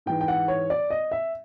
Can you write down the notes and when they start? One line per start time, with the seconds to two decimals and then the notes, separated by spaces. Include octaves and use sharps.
0.06 G#2 E3 G5
0.21 G5
0.28 F#5
0.48 C#5
0.70 D5
0.90 D#5
1.11 E5